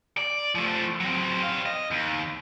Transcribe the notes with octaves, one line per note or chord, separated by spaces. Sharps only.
D5
F3 A3
F#3 C4
G3 F5
D#5
D#2